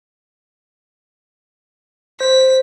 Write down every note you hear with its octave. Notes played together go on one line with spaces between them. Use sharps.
C5 B6